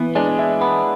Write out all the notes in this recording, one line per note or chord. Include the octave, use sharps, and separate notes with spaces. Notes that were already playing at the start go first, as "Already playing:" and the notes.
Already playing: E3 B3
G#3 D4
E4
B3